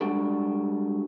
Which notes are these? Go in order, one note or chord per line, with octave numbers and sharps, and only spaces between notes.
G3 G#3 D4 F#4 G4 A4